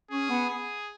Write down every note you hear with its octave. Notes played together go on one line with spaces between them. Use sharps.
C#4 G#4
B3
G#4